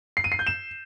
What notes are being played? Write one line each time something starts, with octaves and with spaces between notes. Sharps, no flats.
C7
D#7
C7
G6
E7